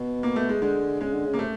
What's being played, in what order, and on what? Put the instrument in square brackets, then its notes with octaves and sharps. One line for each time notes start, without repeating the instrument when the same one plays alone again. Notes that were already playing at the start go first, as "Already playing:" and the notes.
Already playing: [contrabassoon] B2
[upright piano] A#3
A3
G#3
[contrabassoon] D3 [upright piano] G#3
[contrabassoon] C#3 [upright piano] G#3
[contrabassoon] D3
C#3
[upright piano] A#3
[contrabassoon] C3 [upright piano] A3